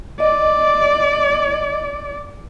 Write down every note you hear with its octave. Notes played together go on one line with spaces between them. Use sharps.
D5 D#5